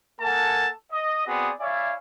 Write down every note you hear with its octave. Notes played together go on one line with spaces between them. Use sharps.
A#3 A4 A#4 F#5 G#5 A5
D#5
B3 C4 F#4 G#4 D5 D#6
E4 C#5 D5 E5 F5 G#5